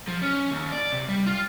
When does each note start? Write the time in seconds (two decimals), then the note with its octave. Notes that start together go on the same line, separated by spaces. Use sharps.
0.08 F3
0.22 C#4
0.51 D#2
0.72 D5
0.92 C3
1.09 G3
1.26 F4